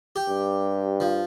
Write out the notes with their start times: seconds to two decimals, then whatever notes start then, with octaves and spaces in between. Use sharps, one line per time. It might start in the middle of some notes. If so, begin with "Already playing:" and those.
0.16 G4
0.28 G2
1.00 F3